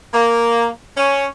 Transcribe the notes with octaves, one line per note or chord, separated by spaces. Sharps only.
A#3
C#4